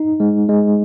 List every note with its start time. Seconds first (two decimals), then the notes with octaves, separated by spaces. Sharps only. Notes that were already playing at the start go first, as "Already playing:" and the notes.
Already playing: D#4
0.20 G#3
0.49 G#3